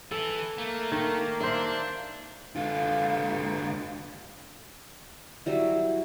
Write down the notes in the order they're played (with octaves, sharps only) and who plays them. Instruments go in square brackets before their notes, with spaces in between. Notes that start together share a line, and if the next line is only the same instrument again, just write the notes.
[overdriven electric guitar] E3 [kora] A4
[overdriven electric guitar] A3 [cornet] A#3
[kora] D#3
[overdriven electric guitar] D4 [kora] C5 E5
[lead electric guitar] D3 F4
[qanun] F#3 G3 E4